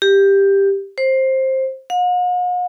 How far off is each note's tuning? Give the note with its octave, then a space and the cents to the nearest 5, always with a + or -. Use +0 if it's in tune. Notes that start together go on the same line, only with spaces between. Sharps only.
G4 +10
C5 +15
F#5 -45